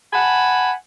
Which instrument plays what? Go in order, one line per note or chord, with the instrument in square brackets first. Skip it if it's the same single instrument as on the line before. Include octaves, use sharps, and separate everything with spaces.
[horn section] F#5 G#5 A5 B5